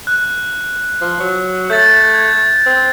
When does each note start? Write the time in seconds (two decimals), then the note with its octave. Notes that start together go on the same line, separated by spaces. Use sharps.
0.07 F#6
1.01 F3
1.20 F#3
1.70 A3 G6 A6
2.14 G#6
2.66 C4